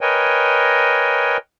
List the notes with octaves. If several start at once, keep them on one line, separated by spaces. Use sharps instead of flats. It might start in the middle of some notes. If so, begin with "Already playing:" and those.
A#4 B4 C#5 D#5 G5 G#5